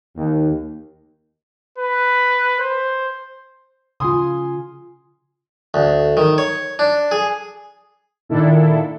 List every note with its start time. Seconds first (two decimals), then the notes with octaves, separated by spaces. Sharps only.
0.15 D#2
1.78 B4
2.60 C5
4.00 C#3 F4 G#5 C6 D#6
5.74 D2
6.17 D#3
6.38 C#5
6.79 D4
7.11 G#4
8.29 A#2 D#3 D4 E4 A4